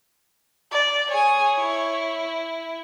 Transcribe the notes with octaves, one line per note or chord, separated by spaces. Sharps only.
D5
G#4 C#5 G#5
E4